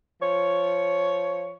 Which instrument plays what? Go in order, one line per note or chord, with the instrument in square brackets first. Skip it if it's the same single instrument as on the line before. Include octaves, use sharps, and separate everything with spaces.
[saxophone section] F3 C#5